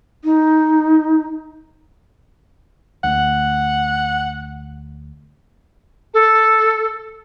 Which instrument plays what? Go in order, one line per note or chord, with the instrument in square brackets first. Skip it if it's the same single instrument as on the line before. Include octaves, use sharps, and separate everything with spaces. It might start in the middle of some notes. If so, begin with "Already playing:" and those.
[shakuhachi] D#4
[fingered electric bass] D2 A3 [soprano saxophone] F#5
[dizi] A4